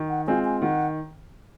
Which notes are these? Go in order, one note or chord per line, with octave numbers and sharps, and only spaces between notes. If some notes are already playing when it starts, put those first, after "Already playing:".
Already playing: D#3
F#5
G#3 C4 F4 G#5
G#5
D#3 F#5